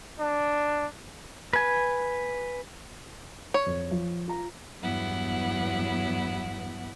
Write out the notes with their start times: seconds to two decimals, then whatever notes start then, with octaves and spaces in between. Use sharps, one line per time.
0.20 D4
1.53 B4 G#5
3.54 C#5
3.66 F2
3.91 F3
4.28 F4 A#5
4.82 E2 G2 F#3 B3 E4 F#5